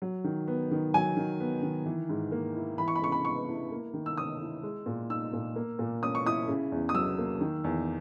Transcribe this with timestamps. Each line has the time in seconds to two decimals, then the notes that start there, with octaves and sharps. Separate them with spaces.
0.02 F#3
0.24 D#3
0.48 B3
0.71 D#3
0.94 F#3 G#5
1.17 D#3
1.40 B3
1.63 D#3
1.86 E3
2.09 G#2
2.32 A#3
2.55 E4
2.78 E3 B5
2.88 C#6
2.96 B5
3.01 C#3 C#6
3.12 B5
3.25 B3 C#6
3.49 E4
3.72 A#3
3.94 D#3
4.06 E6
4.17 C#4 D#6
4.41 E4
4.63 G#3
4.86 A#2
5.10 D#4 E6
5.33 A#2
5.56 A#3
5.79 A#2
6.02 C#4 D#6
6.15 C#6
6.25 E4 D#6
6.48 C#3
6.72 E2
6.89 D#6
6.94 F#3 E6
7.18 A#3
7.41 D#3
7.64 E2